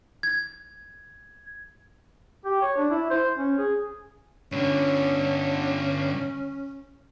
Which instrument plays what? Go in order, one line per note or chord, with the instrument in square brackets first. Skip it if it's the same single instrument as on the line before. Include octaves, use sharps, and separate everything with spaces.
[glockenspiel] G#6
[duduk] G4
C#5
D4
E4
C5
C#4
G#4
[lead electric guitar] G2 D3 [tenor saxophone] C#4